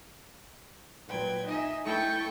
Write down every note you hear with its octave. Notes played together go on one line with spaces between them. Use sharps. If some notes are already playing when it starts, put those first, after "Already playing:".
A#2 F#3 B4 G5 G#6
D#4 D#5 E5 G#5
A3 E4 A4 G5 C#6 G6